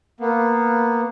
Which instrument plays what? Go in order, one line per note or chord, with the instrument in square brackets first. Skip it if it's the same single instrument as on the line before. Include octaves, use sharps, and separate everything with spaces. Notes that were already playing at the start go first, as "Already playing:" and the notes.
[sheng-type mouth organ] A#3 B3